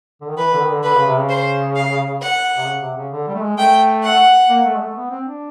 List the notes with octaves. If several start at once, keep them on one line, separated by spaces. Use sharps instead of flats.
D3
D#3
E3 B4
D3
D#3
D3
D3 B4
C#3
C3
C#3
C5
F5
F#5
C3
C#3
C3
C#3
D3
G3
A3
G#3
A3 G5
F#5
A#3
A3
G#3
A3
B3
C4
D4